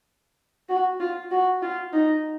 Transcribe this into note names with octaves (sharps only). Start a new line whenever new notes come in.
F#4
F4
F#4
F4
D#4